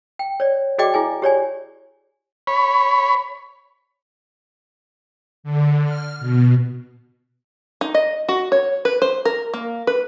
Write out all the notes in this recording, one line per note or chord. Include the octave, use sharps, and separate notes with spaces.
G5
C#5 D5
F#4 G#4 D5 D#5 G5 D6
E4 G#4 G#5
G4 C#5 D5 G#5
C#5 B5
D3
F6
B2
D#4
D#5
F#4
C#5
B4
C5
A#4
A#3
B4